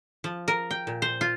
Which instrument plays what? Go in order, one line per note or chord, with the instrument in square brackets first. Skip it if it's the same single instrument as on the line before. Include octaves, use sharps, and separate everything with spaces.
[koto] F3
A#4
G5
A#2
C5
F4